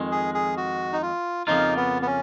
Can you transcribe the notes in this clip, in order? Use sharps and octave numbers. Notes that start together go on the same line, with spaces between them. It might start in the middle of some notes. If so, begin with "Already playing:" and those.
Already playing: F2 D#3 G#3
G#4
G#4
F#4
D#4
F4
F2 C#3 F3 A#3 D#4 F4
B3
B3
C#4